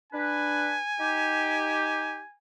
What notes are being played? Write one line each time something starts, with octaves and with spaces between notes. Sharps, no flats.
D4 B4 G#5
D#4 G4